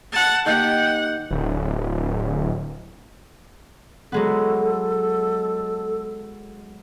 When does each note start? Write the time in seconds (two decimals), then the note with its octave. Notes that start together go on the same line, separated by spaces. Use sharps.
0.12 F#5 A5
0.46 D#3 A#3 G4 F#5 G5
1.30 D1
4.12 F#3 G#3 B3 A4